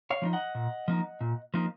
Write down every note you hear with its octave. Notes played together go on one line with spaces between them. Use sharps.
C#5 F5
F3 A#3 D#4
D#5 F#5
A#2
F3 A#3 D#4
A#2
F3 A#3 D#4